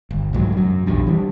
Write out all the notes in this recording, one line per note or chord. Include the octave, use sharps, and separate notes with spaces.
G1
C2 G#2 F3 F#3
F#2 F#3
A#1 E2 G2
E3 G3